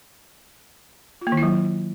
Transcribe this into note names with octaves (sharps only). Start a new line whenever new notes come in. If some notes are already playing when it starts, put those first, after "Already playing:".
F4
A#3
D#3
E4
F#3